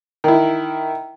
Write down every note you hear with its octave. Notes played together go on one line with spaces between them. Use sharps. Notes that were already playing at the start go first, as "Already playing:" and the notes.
D#3 E4